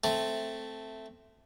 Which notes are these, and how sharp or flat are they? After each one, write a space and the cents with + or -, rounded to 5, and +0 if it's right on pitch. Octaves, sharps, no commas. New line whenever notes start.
A3 +0 C4 +0